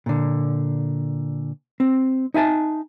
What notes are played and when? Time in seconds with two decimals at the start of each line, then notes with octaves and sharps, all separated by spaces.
0.06 A#2 D3
1.80 C4
2.34 D#4 E5 G#5 A5